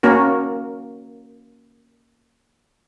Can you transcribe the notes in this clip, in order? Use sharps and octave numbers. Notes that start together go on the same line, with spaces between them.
A#3 C#4 F#4 A#4